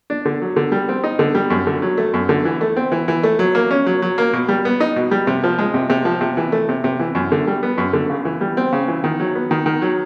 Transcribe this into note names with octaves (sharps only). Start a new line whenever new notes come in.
D4
D3
F#3
D3
G3
C4
D#4
D3
G3
F#2
D3
F#3
A3
F#2
D3
E3
A3
C4
E3
E3
A3
F#3
A#3
C#4
F#3
F#3
A#3
B2
G3
B3
D#4
B2
G3
C3
F3
G#3
C3
C3
F3
C3
E3
A3
C3
C3
E3
F#2
D3
G3
B3
F#2
D3
C#3
E3
G3
C4
C#3
E3
D#3
F#3
B3
D#3
D#3
F#3